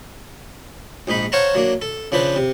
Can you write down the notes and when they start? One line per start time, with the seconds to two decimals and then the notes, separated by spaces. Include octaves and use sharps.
1.07 A#1 G#2 D#4 B5
1.32 C5 C#5 F5 F#5 A5 A#5
1.55 F#3 A#3 D4
1.82 A4
2.12 C#3 F3 D4 B4 C5
2.36 C3